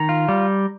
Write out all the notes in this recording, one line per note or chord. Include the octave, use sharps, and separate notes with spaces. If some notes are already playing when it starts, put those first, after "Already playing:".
Already playing: D#3 A#5
F4
G3